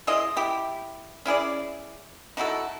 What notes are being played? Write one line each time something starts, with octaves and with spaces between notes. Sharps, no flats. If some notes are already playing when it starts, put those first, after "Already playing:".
E4 F4 G#4 D#5
E4 G4
C#4 E4 G#4 D5
D#4 E4 F#4 A4